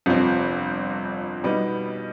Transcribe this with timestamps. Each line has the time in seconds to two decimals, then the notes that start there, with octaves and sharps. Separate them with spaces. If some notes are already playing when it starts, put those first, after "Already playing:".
0.06 G1 F2 C3 F3 C4
1.43 B2 G3 B3 D#4